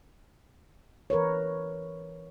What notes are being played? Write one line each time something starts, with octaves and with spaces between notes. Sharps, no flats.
E3 A#4 B4 C#5